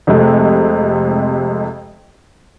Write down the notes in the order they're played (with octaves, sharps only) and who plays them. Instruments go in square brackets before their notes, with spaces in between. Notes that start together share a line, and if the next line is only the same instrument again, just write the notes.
[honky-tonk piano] F2 C3 G#3 A3